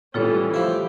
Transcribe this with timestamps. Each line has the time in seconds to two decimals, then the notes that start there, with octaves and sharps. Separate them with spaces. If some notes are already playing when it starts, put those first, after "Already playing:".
0.14 A2 E3 G3 C#4 F4 A4 C#5
0.54 F3 E4 G4